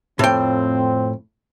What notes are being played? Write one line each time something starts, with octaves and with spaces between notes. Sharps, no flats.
F2 A2 C4 G5